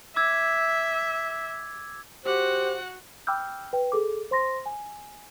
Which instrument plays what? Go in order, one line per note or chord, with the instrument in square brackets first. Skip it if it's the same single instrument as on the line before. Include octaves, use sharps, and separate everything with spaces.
[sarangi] E5 [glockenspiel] D6 E6 G#6
[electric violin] F#4 F#5 [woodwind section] G4 [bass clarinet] C5
[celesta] G5 B5 D6 E6 F6 G6
B4 G5
G#4 A4 D6
C5 C6 A#6
G#5